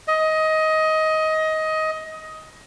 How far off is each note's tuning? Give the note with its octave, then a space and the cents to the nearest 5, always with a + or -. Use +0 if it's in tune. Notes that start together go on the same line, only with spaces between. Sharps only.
D#5 +15